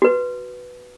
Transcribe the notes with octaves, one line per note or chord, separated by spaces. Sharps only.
F#4 B4